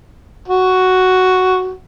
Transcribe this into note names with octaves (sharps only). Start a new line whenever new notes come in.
F#4